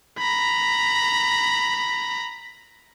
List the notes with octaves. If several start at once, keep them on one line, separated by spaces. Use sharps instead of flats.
A#5 B5